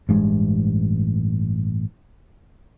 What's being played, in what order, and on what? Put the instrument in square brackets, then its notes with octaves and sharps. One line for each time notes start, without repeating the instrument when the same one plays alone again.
[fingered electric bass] A1 G2 G#3